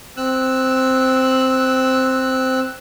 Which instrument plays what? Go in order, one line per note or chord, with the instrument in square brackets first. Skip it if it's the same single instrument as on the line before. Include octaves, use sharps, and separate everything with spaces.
[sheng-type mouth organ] C4 E6 F#6